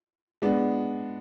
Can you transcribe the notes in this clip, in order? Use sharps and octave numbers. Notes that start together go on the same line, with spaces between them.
G#3 B3 D4